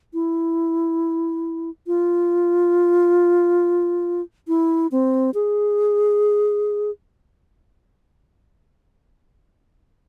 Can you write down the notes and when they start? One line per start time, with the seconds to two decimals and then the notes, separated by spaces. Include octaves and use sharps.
0.14 E4
1.87 F4
4.48 E4
4.91 C4
5.34 G#4